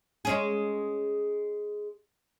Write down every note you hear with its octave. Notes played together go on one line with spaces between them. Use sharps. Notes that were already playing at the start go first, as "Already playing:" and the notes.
G#3 C#4 G#4